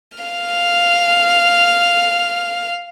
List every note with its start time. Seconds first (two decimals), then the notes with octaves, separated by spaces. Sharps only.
0.19 F5 F6